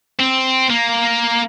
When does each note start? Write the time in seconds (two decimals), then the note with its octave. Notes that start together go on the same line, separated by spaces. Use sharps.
0.19 C4
0.70 A#3